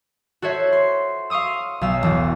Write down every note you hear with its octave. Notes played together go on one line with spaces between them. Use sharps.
F#4 A4 C5 C#5 E5
C6
F5 C6 C#6 D#6 E6
B1 F5 E6
E1 B1